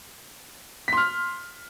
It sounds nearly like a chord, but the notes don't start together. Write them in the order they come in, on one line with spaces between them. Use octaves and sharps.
B6 C6 F6